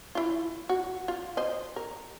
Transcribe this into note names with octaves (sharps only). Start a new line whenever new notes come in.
E4 F4
F#4
F4
C5 D#5
A#4